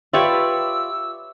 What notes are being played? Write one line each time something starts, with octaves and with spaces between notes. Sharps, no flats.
F4 G4 B4 C#5 D5 E5 C#6 E6